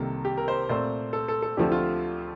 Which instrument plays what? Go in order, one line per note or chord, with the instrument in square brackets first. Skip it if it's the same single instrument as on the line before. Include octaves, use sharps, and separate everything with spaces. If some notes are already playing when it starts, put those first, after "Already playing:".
Already playing: [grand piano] C2 C3 D#3 A#3 A4
G4
A#4
C5
A#2 A3 C4 C5
A4
A4
A4
D2 D3 F3 A3 C4 G4
F4